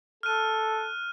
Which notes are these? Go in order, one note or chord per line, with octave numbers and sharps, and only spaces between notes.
A4 F6 F#6 D#7